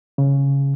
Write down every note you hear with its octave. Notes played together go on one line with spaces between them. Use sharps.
C#3